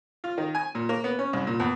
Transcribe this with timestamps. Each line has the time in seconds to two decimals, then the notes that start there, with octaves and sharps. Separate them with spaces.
0.24 F4
0.38 D#3
0.55 G#5
0.75 A#2
0.89 A#3
1.04 B3
1.19 C#4
1.33 C2
1.47 A#2
1.60 E2